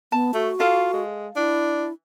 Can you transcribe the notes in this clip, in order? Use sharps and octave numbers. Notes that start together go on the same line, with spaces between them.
B3 A5
A3 F#4
F4 A4 F5
G#3
D4 E4